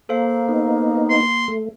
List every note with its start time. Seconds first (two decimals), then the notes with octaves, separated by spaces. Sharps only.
0.09 A#3 A4 C5 F5
0.48 B3 D#4
1.10 C6
1.48 A3